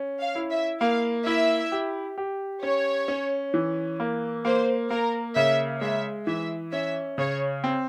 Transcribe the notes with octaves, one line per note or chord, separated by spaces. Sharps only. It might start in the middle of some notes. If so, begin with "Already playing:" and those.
Already playing: C#4
F5
E4
E5
A#3 F5
E4 E5
G4
G4
C#4 C#5
C#4
E3
A#3
A#3 C5
A#3 A#4
C#3 E5
G#3 E5
E3 E5
C#4 E5
C#3 C#5
C4